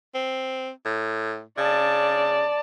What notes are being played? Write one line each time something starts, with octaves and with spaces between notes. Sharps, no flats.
C4
A2
C#3 D5 A5